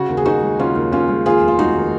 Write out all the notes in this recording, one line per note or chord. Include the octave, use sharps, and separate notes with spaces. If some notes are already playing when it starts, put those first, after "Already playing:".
Already playing: C#3 F#4
D#2
G#4
D#2 D#4 F#4
G#3
C#3 C#4 F4
D#2
D#2 C#4 F4
G#3
D#2 F4 G#4
F1
F4
G#3 D#4 F#4
D#3